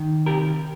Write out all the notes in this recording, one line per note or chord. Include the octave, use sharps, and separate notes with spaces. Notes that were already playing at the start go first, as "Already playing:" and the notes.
Already playing: D#3
C3 G4 A#4